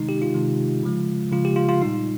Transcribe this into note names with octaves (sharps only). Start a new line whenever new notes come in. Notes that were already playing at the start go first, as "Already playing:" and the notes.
Already playing: C3 D#3 G#3 D#4
G4
F4
C3 D#3 G#3
C#3 F3 G#3
C#3 F3 G#3 F4
G4
F4
F4
A#2 G3 D#4